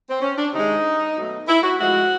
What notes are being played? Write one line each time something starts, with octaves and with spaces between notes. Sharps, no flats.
C4
C#4
D4
C3 D#3 G#3 D#4
B2 F#3 A3
E4
F#4
A2 F3 G#3 F#4